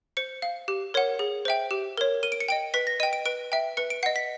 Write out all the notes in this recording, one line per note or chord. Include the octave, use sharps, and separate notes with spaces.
C5 C#7
F5
G4
A#4 C#5 F#5
G#4
C5 E5 G5
G4
A#4 C#5
A#4 D#7
D7
C#7
D#5 G5 D7
B4 B6
A#6
D#5 G5 D#7
D7
B4 D7
E5 G5
B4 C#7
D7
D#5 F#5 C7
B6